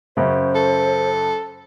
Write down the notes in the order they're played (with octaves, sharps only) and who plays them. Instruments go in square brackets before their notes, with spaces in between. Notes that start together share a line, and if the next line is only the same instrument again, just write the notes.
[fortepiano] F#2 C#3 [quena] C5
[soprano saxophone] A4